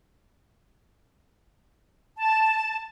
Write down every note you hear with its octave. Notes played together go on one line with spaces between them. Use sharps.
A5